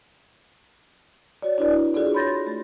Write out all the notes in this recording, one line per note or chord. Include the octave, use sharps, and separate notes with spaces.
F#4 C#5 D5
D4 E4 F#4 B4 D5
D4 F4 F#4 G#4 A4 D5
C#5 B5 C6 G6 A6 A#6
A3